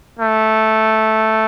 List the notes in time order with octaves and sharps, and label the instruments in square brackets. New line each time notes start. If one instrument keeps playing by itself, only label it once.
[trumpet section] A3